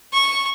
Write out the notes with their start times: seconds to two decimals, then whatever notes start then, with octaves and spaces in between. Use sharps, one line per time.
0.13 C#6